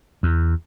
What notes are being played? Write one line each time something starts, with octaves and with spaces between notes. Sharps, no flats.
E2